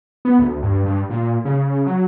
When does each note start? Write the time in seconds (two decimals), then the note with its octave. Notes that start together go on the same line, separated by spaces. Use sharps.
0.25 B3
0.39 D2
0.63 G2
0.86 G2
1.10 A#2
1.45 C#3
1.86 F#3